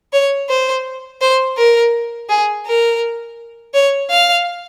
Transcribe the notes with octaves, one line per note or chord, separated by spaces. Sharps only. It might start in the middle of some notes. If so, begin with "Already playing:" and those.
C#5
C5
C5
A#4
G#4
A#4
C#5
F5